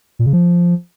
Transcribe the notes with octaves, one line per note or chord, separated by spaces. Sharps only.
A#2
C#3
F3